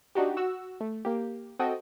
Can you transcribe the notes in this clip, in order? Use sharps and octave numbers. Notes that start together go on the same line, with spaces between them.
D4 D#4 F#4 G4
F#4 E6
A3
A#3 G4
C4 F#4 A4 D#5 G5